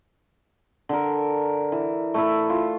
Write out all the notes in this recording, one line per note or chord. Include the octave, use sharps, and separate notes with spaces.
D3 A#4
E3
A3 E4
F4